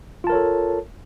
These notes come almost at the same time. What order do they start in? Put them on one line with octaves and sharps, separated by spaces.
F4 A5 A#4 C#5 A4